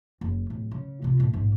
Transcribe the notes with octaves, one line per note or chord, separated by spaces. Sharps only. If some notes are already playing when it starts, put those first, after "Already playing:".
F#1
D1
C#3
C3 F4
A2
A#1 G#2